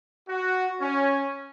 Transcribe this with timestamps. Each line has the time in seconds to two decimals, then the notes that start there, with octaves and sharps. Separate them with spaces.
0.27 F#4
0.80 C#4